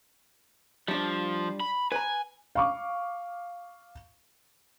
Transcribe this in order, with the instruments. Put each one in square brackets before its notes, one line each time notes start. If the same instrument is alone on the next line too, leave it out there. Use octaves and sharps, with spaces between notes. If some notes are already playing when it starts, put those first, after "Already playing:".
[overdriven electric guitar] F3 [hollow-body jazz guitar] G3 D4
[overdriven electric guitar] B5
[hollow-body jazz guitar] B4 A#5 [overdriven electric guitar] G#5
[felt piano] F5 C#6 D6